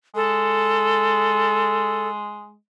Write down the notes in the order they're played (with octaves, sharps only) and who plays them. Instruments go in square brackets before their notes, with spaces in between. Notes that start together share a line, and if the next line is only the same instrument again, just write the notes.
[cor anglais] G#3 [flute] A4